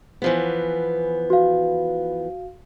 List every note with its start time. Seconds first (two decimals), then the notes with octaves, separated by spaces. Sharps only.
0.22 E3 F3 B3
1.30 F#4 F5